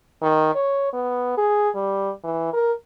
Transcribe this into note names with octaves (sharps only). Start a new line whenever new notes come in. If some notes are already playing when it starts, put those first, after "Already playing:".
D#3
C#5
B3
G#4
G3
E3
A#4